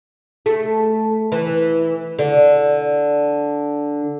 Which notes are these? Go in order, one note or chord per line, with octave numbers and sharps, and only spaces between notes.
A3
E3
D3